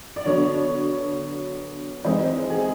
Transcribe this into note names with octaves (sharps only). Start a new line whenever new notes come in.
D5
D3 F#3 B3 D4 C#5
E3 G#3 C4 D#4 C5
G#4